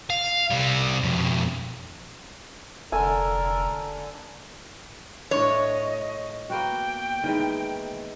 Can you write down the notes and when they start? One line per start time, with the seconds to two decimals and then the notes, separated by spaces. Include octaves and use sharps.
0.10 F5
0.50 C3 G3
1.03 F2 B2
2.92 F1 D3 A4 A#4 G#5
5.31 A2 D4 C#5 D#5
6.50 A#3 B3 F#4 G5
7.24 D#3 E3 G#3